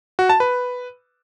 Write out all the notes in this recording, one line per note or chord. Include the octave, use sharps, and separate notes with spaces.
F#4
A5
B4